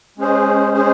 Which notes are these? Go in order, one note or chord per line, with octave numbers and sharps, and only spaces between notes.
G#3 C#4 G#4 C5
G#3 C#4 G#4 C5